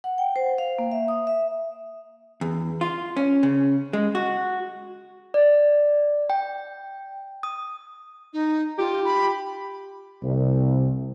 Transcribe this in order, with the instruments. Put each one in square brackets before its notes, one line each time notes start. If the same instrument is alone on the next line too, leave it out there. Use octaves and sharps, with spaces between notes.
[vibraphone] F#5
G5
C5
F5
A#3
E5
D#6
E5
[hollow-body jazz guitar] E2
F4
C#4
C#3
G#3
F#4
[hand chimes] D5
G5
D#6
[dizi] D#4
[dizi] F4 [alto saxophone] G4
[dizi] B5
[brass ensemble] C2